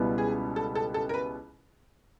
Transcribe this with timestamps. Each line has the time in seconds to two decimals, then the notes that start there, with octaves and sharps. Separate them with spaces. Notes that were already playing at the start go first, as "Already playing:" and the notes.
Already playing: C#2 B2 G3 B3 E4
0.18 G#4
0.56 A4
0.75 A4
0.94 A4
1.09 A#4
1.14 B4